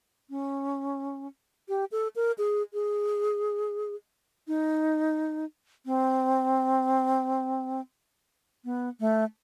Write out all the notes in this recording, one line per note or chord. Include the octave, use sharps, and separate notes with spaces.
C#4
G4
A4
A#4
G#4
G#4
D#4
C4
B3
A3